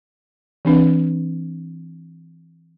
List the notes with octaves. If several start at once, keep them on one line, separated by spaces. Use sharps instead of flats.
E3 C4 D4 B4